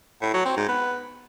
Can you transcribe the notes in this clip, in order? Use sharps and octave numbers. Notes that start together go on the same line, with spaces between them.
A2
F#3
C4
G#2
B3